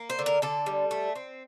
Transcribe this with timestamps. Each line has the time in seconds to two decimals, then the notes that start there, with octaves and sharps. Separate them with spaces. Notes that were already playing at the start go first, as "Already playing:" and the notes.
Already playing: A#3
0.10 C5
0.19 D3
0.26 A#4
0.42 D3 A4
0.66 G3
0.91 A3
1.16 C4